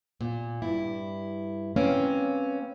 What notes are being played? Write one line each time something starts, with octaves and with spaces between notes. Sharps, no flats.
A#2
G2 E4
A#3 C4 C#4 B4 F5